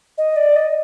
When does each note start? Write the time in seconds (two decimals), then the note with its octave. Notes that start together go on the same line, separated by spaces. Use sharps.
0.18 D#5
0.36 D5
0.56 D#5